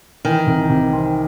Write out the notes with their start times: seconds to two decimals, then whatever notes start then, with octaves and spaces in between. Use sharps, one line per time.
0.25 D#3 E3
0.47 C2
0.70 C3
0.93 C4